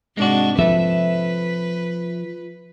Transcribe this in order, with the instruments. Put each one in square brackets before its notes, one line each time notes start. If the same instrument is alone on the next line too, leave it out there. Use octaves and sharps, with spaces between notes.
[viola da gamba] G#2 C3 D4 [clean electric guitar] G#3 F#4
[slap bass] F3 [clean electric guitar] A4 E5 [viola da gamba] B4